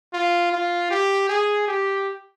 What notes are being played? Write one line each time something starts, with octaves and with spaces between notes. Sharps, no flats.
F4
F4
G4
G#4
G4